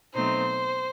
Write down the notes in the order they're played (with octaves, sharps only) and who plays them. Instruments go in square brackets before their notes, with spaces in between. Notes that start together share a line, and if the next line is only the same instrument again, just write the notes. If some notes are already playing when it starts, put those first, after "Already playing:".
[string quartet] B2 F#3 A3 C4 D#4 C5